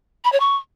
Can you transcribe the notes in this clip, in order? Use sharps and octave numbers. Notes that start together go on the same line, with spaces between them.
B5
C#5
C#6